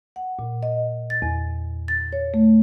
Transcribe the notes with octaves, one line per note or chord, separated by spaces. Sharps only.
F#5
A#2
D#5
A6
E2
A6
C#5
A3